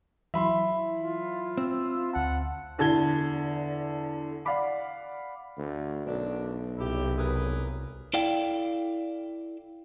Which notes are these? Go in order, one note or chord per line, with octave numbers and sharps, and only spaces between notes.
E3 F#3 E4 E5 B5 C6
F4
C4 E6
D2 F#5 A5
E2 D3 A5 G#6 G7
D5 F5 F#5 B5 D6
D2
B1 F#2 D4
C2 E4 G4
G#4 A#4 B4
E4 A4 D5 F5 G5